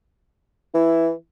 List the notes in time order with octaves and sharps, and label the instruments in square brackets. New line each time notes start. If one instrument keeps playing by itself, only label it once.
[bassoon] E3 [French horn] E4